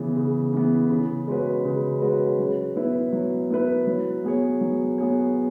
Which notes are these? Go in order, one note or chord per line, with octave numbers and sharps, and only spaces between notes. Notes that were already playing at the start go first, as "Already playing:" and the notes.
Already playing: C#3 E3 B3
C#3
E3 B3
C#3
G#3 C#4 F#4 B4
C#3
G#3 C#4 F#4 B4
F#3
B3 E4 B4
F#3
B3 E4 B4
F#3
B3 G#4 C#5
F#3
B3 G#4 C#5